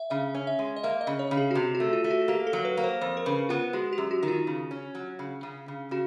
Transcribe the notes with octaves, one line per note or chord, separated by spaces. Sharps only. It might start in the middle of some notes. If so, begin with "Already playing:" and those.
Already playing: E5
C#3 E5
C#4
E5
G#3
D#5
A#3 E5
D#5
C#3
C#5
C#3
G#4
F#4
C3 G4
F#4
A3
F4
A3
F#4
A#3 G4
A4
F#3
B4
A#3
C5
F2 C5
A#4
C#3 B4
B3 F4
G#3 F#4
G4
F#2
F#4
D#3
F4
C#3
C#4
F#3
C#3
C#3
C#3
C#3 F#4